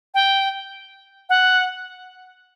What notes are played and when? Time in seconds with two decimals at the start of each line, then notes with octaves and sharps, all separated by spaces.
0.14 G5
1.29 F#5